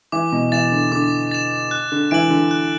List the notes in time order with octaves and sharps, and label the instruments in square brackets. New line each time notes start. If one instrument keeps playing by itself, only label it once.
[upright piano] E3 [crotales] D6
[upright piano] B2
[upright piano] E3 [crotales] A6 E7
[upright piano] D3
[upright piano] D3 [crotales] D6
[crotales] A6 E7
F#6
[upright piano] D3
[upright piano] E3 [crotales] D7 F#7
[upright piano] D3
[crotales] F#6